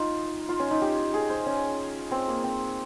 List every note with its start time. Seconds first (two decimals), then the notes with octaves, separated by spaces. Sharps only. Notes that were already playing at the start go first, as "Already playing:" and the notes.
Already playing: D#4 F4
0.49 F4
0.59 C#4
0.71 D#4
0.82 G4
1.14 G#4
1.30 C5
1.46 C#4
2.11 C4
2.28 A#3
2.44 C4